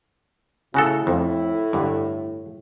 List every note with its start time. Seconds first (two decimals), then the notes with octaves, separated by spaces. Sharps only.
0.74 A2 C#3 E4 F#4 A4
1.07 F2
1.73 G2 D3